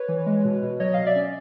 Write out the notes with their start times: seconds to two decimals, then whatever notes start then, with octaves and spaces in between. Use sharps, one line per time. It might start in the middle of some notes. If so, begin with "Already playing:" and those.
Already playing: B4 C#5
0.08 E3
0.26 G#3
0.45 B2
0.63 B2
0.80 F#3 C#5 D#5
0.93 B2 D#5 F5
1.06 D5 E5
1.16 C#4